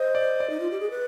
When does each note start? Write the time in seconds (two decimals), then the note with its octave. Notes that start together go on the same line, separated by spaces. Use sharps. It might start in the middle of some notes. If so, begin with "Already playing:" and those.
Already playing: C5 D#5
0.15 D5
0.40 D5
0.50 D#4
0.60 F4
0.71 G4
0.80 G#4
0.91 B4